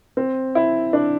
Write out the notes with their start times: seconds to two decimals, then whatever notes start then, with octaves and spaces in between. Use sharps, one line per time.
0.17 C4
0.55 E4
0.93 D4